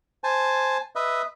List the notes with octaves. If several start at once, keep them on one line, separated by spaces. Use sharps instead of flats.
C5 G#5 A5
B4 D#5 E5